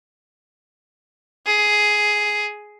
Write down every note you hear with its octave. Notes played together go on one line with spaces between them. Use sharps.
G#4